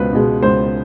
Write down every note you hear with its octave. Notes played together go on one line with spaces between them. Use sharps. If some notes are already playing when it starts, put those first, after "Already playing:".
Already playing: C#2 B2 B4 C5
B2 G#3
C#2 C5